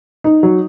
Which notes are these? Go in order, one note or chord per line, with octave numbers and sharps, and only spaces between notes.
D#4
F#3